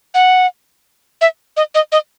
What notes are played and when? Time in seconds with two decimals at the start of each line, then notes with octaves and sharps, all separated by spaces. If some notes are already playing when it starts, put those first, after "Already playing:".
0.14 F#5
1.21 E5
1.57 D#5
1.75 D#5
1.92 D#5